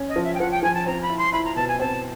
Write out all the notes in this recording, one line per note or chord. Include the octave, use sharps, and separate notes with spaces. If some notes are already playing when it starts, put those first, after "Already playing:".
Already playing: C#4
D#5
F3
E5
G5
F3 F#5
G5
F3 G#5
A5
C4 A#5
B5
E4
C6
E4 B5
A#5
B2 A5
G#5
C4 A5